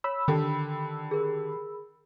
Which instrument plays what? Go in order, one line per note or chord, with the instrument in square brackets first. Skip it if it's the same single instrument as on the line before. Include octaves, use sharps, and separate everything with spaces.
[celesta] C#5 [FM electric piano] B5 E6
[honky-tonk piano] D3 G4 [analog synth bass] D#3 [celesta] A4
[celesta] G#4 A#4